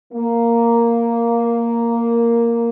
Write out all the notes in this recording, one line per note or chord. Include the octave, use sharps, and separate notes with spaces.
A#3